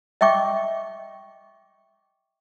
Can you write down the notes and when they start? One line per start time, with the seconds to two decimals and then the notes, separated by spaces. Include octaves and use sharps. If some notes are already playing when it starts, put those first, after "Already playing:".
0.21 D#5 E5 G5 C#6 D6